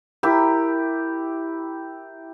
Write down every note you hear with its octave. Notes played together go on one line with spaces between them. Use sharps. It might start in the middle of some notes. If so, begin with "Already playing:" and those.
E4 G4 A#4